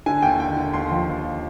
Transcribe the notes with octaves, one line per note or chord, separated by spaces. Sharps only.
D3 G#5
D#2 G5
D3 G5
D3
D#2 C6
F3
D#2